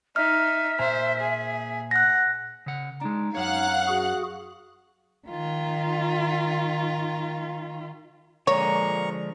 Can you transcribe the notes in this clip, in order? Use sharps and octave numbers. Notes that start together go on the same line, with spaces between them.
D#4 E5 F6
A#2 C5 G#5 A#5
G#4
F#5 F#6 A#6
C#3 F#5
G#3 D4 D#4
F#2 C#5 F5 F#5 F#6
F#4 G#4
D#3 F4
A#2 D3 F3 G#3 C#5 A#5 C#6